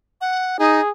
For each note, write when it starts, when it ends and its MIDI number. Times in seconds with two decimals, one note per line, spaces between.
0.21 0.57 78
0.59 0.80 63
0.59 0.90 68